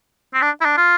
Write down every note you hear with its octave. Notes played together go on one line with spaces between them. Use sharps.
C4
D4
E4
D4
F4